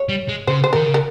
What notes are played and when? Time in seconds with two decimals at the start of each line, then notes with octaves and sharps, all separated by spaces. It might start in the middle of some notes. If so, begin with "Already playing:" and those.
Already playing: C#5
0.09 G3
0.29 G#3
0.47 C#3 C5
0.64 C5
0.73 D#3 A#4
0.85 C#3
0.94 A#4